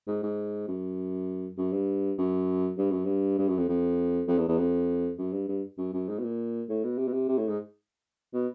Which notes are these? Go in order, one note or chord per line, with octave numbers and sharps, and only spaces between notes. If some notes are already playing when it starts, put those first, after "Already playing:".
G#2
G#2
F#2
F#2
G2
F#2
G2
F#2
G2
G2
F#2
F2
F2
F2
E2
E2
F2
F#2
G2
G2
F#2
F#2
G#2
B2
A#2
A2
B2
C3
B2
C3
C3
A2
G#2
B2